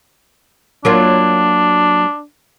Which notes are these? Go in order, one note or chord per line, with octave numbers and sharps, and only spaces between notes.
F#3 A#3 D4 F4